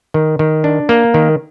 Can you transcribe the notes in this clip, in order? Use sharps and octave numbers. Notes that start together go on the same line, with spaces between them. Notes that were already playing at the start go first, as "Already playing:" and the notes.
D#3
D#3
D4
A#3
D#3